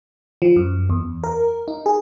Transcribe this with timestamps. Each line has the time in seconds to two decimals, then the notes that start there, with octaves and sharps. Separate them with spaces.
0.42 F3
0.56 F#2
0.90 E2
1.24 A#4
1.68 D#4
1.86 G#4